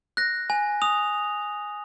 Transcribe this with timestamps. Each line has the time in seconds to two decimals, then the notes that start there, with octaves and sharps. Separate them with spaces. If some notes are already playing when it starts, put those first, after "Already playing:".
0.17 F#6 A#6
0.50 G#5
0.82 D#6 F7